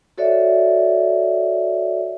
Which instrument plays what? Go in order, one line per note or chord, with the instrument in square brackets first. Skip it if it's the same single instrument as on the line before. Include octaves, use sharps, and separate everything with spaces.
[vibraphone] F#4 A4 C#5 D5 E5